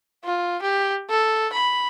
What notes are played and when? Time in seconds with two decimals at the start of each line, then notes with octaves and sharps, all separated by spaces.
0.24 F4
0.62 G4
1.10 A4
1.53 B5